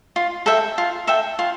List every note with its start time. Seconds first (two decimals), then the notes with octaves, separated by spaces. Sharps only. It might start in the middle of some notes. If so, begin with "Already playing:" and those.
0.16 F4
0.46 A4 E5 G5
0.78 F4
1.07 A4 E5 G5
1.39 F4